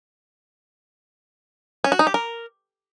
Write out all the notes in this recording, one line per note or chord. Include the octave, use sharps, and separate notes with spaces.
C#4
F#4
D#4
G4
A#4